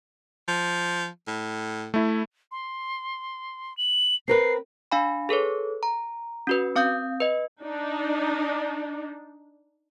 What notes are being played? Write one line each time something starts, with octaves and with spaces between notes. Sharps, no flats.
F3
A2
A3 E4
C6
F#7
C4 A#4 B4 C7
D4 F5 G#5 B5
G#4 A4 B4 C#5
A#5
C#4 F#4 B4
C4 F5 D#6 G6
B4 D#5
D4 D#4